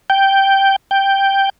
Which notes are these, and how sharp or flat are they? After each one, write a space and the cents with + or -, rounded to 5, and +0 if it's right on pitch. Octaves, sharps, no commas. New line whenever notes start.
G5 -5
G5 +0